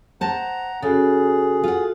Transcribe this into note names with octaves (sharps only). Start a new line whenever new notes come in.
C5 F#5 A5 A#5
C#3 F#4 G#4 A4
F4 F#5